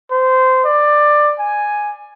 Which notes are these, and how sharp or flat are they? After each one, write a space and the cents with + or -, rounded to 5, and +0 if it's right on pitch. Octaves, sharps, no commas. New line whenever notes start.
C5 -20
D5 +15
G#5 +0